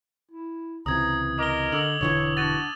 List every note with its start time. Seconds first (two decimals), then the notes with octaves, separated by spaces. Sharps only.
0.31 E4
0.86 C#2 C3 E3 A#5 D#6 G#6
1.39 A#4 D#5 D6 G7
1.72 D3 D6 E6 F#7
2.01 E1 D3 E3 C#5
2.37 D4 F#4 A6 D#7